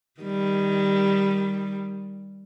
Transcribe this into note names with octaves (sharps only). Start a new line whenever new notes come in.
D#3 G3